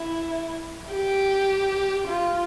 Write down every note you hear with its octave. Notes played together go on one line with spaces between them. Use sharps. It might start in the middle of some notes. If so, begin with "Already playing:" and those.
Already playing: E4
G4
F4